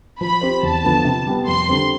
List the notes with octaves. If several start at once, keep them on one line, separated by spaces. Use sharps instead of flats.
F3 B5
C4 G4 C5
E2 A5
D3 F3 B3
C3
G3 B3
F2 C6
D3 G3 C4